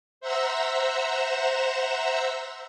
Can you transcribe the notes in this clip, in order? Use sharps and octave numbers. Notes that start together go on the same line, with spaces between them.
C5 E5 F#5 A#5 E6